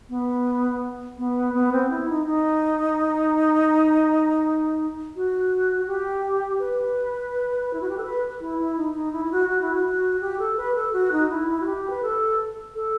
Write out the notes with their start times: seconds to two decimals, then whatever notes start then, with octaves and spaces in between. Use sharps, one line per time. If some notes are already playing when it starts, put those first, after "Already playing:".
0.09 B3
1.18 B3
1.54 B3
1.72 C4
1.90 E4
2.09 D#4
2.26 D#4
5.16 F#4
5.87 G4
6.60 B4
7.73 E4
7.81 F#4
7.89 G4
7.97 A4
8.04 B4
8.41 E4
8.59 E4
8.77 D#4
8.95 D#4
9.12 E4
9.25 E4
9.31 F#4
9.49 F#4
9.61 E4
9.73 F#4
10.21 G4
10.39 A4
10.57 B4
10.75 A4
10.93 F#4
11.12 D#4
11.30 E4
11.47 E4
11.61 F#4
11.65 G4
11.90 B4
12.02 A4
12.75 A4